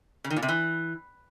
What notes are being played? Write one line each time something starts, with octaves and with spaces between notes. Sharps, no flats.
C#3
D#3
A#2
C3
E3